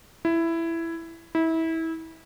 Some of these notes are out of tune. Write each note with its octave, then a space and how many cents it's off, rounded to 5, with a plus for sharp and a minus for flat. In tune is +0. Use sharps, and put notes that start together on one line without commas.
E4 +10
E4 -25